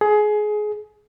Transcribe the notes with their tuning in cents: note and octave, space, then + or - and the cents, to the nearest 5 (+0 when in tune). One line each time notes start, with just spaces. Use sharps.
G#4 +20